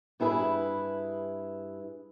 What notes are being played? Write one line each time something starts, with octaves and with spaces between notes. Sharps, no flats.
G2 E4 G#4 B4